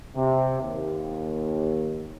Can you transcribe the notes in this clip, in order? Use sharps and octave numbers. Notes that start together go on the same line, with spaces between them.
C3
D#2